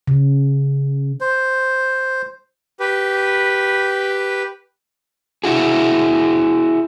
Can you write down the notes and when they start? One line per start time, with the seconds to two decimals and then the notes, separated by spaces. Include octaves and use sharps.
0.07 C#3
1.21 C5
2.80 G4 B4
5.44 E4 F#4 G#4